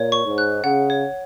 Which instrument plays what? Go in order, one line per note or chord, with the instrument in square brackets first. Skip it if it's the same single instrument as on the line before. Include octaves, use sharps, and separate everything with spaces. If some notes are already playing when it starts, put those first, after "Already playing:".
Already playing: [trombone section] A#2 [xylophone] C#5
[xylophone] C#6
[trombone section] G#2
[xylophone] F#6
[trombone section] C#3 [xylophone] F#5
[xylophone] C#5